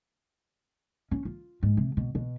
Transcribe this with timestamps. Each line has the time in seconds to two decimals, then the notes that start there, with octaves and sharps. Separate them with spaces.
1.11 C#4
1.25 F4
1.63 G#2
1.77 C3
1.97 B2
2.15 B2